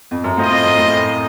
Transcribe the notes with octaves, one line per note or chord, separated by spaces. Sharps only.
F2
F#2
A2 C4 F4 C5 D#5
F2
F#2
A2